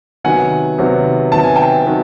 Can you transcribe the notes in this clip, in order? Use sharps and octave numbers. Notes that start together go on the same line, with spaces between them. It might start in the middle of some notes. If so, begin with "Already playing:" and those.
C3 D#3 F#3 B3 F#5 G#5
C3 D#3 F#3 B3
C3 D#3 F#3 B3 A5
G#5
G5 A5
D#3 F#3 B3